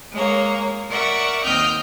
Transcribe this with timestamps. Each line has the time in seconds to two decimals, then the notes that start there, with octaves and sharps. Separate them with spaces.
0.13 G#3 A#3 C#5
0.90 A#4 D5 E5 F#5 C#6
1.43 D#2 C4 D#5 G5 F6 G6